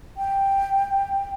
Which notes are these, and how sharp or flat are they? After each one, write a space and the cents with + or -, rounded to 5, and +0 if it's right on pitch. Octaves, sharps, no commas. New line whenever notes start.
G5 +5